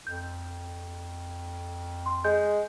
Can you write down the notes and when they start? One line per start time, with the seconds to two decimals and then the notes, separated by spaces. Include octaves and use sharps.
0.07 F2 G6
2.06 C6
2.24 G#3 G6